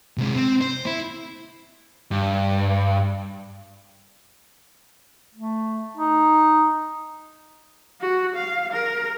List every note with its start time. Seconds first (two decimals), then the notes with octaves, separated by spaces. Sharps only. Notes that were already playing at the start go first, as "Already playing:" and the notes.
0.18 C3 G#3
0.35 C4
0.61 C5
0.86 E4
2.11 G2
5.35 A3
5.97 D#4
8.01 F#4
8.35 F5
8.73 A#4